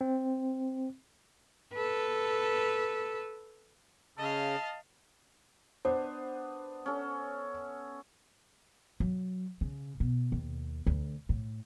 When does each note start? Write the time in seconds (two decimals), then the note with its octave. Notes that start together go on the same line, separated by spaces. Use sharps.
0.01 C4
1.74 A4 B4
4.18 C#3 D#5 F5 A5
5.85 B3 D4 C5
6.86 C#4 A4
9.00 F#3
9.61 C#3
10.00 B2
10.32 D#2
10.87 D2
11.29 A2